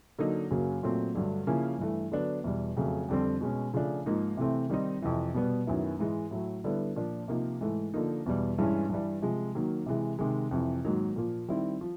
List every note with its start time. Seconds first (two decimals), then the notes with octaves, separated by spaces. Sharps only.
0.19 D3 F#3 A#3 D#4
0.51 F#2 C#3 F#3 A#3
0.83 A#2 F#3 A3 C4
1.14 G2 D3 F#3 A3
1.47 C#3 F3 A#3 C#4 E4
1.79 G2 E3 A3
2.12 D3 F#3 B3 D4
2.44 E2 B2 G3
2.76 F2 C#3 F#3 A3
3.08 F2 D3 G3 C4
3.41 B2 G#3 C#4
3.74 C#3 F3 A3 D4
4.06 G#2 F3 A#3 D#4
4.37 C3 E3 A3 C4
4.70 D#3 G3 C4 D#4
5.02 F2 C3 E3
5.34 B2 G3 B3
5.67 F#2 D#3 F#3 B3 E4
5.99 G#2 E3 G#3
6.31 A2 F#3 A3
6.64 D3 G3 B3 E4
6.96 A#2 F3 A#3 D4
7.28 C3 F3 A#3 D#4
7.61 G#2 E3 A3
7.94 D3 F3 A#3 D#4
8.26 E2 B2 G3
8.58 G2 E3 G#3 C#4 E4
8.89 G2 E3 G3
9.22 C3 F3 G#3
9.55 D#3 F#3 A#3
9.86 C3 E3 G#3
10.19 C3 D#3 G#3
10.51 F2 C3 E3
10.84 G#2 D#3 F#3 A#3 D#4
11.16 A#2 F3 A#3
11.48 D#3 G3 C4 E4
11.81 F3